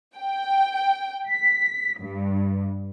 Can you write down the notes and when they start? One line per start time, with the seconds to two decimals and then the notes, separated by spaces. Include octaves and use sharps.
0.17 G5
1.29 B6
2.00 G2